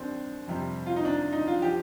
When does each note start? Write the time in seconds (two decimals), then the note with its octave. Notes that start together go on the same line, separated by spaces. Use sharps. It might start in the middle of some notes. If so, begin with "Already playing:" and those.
Already playing: D#2 G3 C4 D4
0.47 F2 C3 G3
0.86 F4
0.96 D#4
1.05 D4
1.33 D#4
1.48 F4
1.62 F3 G4